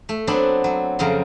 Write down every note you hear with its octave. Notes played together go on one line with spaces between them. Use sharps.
A3
F#3 B3 C4 D4
F#3
F2 C#3 F#3 F5 A#5 C6